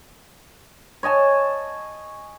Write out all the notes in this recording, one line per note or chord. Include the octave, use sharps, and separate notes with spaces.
C#5 D#5 G#5 A5